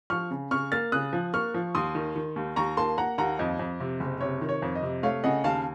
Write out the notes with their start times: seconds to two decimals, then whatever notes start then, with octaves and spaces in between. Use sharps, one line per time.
0.10 F3 C#6 F6
0.31 C#3
0.51 C#3 C#6 F6
0.72 A#3 F6 A6
0.92 C#3 D#6 F#6
1.13 F3
1.33 A#3 C#6 F6
1.54 F3
1.75 D#2 C6 D#6
1.95 D#3
2.16 D#3
2.36 D#2
2.56 D#2 A#5 C#6
2.77 A#3 A5 C6
2.98 A#3 F#5 A#5
3.18 D#2 F#5 A#5
3.39 F2 D#5
3.59 F2
3.80 C3
4.00 F#1
4.21 C3 C#5
4.41 D#3
4.49 C#5
4.62 F2
4.75 D#5
4.83 C3
5.03 A3 C#5 F5
5.24 C#3 D#5 F#5
5.44 D#2 F5 A5